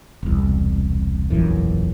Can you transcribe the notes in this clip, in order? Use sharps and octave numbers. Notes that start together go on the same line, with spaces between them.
E1 C2
E1 A#1 F#2 E3